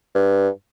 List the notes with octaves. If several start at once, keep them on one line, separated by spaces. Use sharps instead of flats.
G2